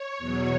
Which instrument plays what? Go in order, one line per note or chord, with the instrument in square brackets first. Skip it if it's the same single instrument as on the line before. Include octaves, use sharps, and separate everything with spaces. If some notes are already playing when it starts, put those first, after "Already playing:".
Already playing: [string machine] C#5
E2 B2 F#3